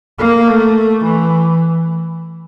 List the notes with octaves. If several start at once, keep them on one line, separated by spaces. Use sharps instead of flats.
A#3
A3
E3